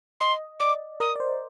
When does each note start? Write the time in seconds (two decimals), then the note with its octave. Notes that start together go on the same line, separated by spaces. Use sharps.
0.20 D#5 C6
0.60 D5 D6
1.00 A#4 D#6
1.16 D5
1.20 C5